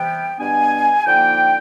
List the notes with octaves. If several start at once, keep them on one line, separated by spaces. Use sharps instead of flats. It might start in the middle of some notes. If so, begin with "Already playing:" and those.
Already playing: C3 E3 G3 B3 G5
B2 G3 B3 D4 G#5
D3 F3 A#3 D#4 G5